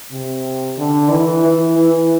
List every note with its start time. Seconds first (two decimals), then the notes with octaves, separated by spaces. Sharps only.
0.12 C3
0.78 D3
1.11 E3
1.45 E3
1.78 E3